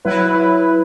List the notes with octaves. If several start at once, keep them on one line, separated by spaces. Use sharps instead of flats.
F#3 E4 B4